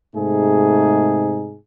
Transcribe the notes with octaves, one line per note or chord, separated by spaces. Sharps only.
G#2 C3 A3 D#4 G#4